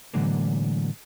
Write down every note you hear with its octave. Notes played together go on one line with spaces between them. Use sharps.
A2 D3 E3 F#3 G#3 A#3